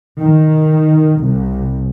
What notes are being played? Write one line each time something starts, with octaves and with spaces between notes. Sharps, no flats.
D#3
C2